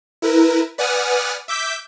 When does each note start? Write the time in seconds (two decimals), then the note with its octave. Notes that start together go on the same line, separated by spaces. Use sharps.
0.22 E4 A#4 B4
0.78 B4 D5 F#5 G#5 D#6 F6
1.48 E5 D6 G6 B6